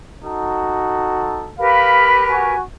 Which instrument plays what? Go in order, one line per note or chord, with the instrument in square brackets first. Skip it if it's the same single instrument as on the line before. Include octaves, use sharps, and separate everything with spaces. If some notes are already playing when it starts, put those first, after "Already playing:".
[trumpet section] D#4 A4 [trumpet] F#4
[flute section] G4 A#4 B4 [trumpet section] F5 [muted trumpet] B5
[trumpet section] F#4 [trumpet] G#5